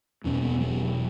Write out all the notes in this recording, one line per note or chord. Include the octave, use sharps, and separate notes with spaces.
E1 E2 B2 C#4
B3
F#3